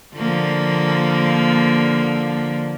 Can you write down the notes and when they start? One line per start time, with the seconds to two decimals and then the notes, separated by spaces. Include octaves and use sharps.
0.16 D3 F3 A#3